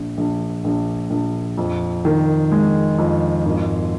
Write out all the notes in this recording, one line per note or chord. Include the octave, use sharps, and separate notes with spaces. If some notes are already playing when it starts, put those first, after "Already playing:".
Already playing: A#1
A#1
A#1
A#1
F2
D#3
G#3
F2
G#1